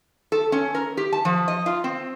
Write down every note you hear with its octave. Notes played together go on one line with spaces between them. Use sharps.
A4
C#4
A#4
G4
A5
F3
D#5
F4
C4